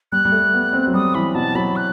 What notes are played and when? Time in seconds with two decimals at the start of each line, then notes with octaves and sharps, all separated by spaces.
0.12 G3 F#6
0.25 G3
0.32 A3
0.54 B3
0.73 C4
0.87 F#3
0.94 G3 D#6
1.15 E3 B5
1.35 B2 A5
1.55 F#3 B5
1.76 F#6